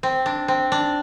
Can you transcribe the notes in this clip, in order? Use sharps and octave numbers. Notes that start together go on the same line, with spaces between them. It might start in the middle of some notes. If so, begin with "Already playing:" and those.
C4
D4
C4
D4